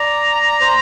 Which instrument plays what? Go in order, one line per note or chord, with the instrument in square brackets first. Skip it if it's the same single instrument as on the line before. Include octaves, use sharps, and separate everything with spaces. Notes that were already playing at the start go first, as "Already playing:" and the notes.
Already playing: [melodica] D5 [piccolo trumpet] A#5
[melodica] C5